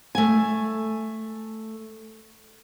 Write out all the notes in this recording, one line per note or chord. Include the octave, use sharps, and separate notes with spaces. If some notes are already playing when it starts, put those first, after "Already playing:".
A3 G#5